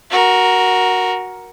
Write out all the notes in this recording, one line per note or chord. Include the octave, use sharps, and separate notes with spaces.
F#4 A#4